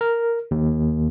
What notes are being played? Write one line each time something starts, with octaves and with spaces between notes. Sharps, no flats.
A#4
D#2